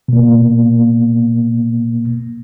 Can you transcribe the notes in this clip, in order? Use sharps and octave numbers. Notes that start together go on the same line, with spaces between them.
B2 A#3